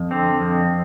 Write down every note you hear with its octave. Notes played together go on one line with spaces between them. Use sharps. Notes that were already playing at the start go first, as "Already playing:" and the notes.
Already playing: F2
D3 C4
F2